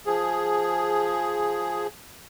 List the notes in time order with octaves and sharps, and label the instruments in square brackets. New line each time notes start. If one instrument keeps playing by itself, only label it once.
[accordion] F3 G#4